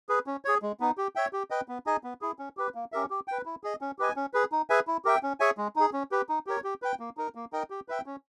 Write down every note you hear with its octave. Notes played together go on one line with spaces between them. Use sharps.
G#4 B4
C#4
G#4 C#5
G#3
B3 D#4
G4
C#5 E5 G5
G4
B4 D#5 G5
B3
D#4 G#4 D#5 G#5
B3
E4 G#4
C#4
G4 B4
A#3
C#4 G4 A#4 E5
G4
B4 G5
E4
G#4 D#5
C#4
G4 B4 D#5 G#5
C#4
G#4 B4
D#4
G#4 B4 E5 G#5
E4
G4 A#4 E5 G5
C#4
G#4 C#5 E5 G#5
G#3
D#4 G#4
C#4
G4 B4
D#4
G4 A#4 C#5
G4
B4 G5
A#3
D#4 A#4
A#3
D#4 A#4 D#5 G5
G4
B4 E5 G5
C#4